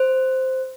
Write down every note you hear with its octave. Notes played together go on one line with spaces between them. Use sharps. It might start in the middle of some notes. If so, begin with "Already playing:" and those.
Already playing: C5